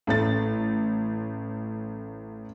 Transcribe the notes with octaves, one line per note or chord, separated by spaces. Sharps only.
A1 A3 A6